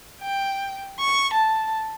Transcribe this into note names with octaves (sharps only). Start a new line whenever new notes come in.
G5
C#6
A5